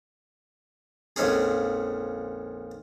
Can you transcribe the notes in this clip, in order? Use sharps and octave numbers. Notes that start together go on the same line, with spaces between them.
A#1 F2 G#2 C#4 G#4